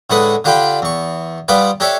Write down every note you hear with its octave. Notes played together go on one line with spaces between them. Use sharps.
A2 D3 G#3 B4 F#5 D#6
D3 D4 F4 G4 G5 B5
E2 C#6
G3 B3 F4 B4 D5
D4 G4 A4 C#5 E5